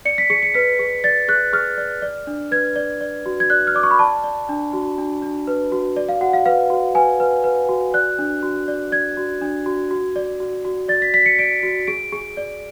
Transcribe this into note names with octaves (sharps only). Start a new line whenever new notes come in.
D5 C#7
B6
G#4 C#7
C#7
B4 B6
G#4
D5 A6
G#4 F#6
G#4 F6
D5
D5
D4
B4 G#6
D5
D5
F#4
G#6
D5 F#6
F6
D5 D6
C#6
B5
D5 A5
D5
D4
F#4
D4
D4
B4
F#4
D5
F5
F#4 F#5
F5
B4 F5
F#4
B4 G#5
B4
B4
F#4
D5 F#6
D4
F#4
D5
D5 G#6
F#4
D4
F#4
F#4
D5
F#4
F#4
D5 A6
B6
D5 B6
C#7
D5 D7
F#4
G#4 D7
G#4
D5